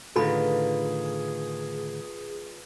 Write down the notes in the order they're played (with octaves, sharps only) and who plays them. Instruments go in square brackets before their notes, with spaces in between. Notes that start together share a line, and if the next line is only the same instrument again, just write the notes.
[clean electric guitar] A2 D3 D#3 [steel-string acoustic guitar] F4 B4 [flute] G#4 [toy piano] A4 B5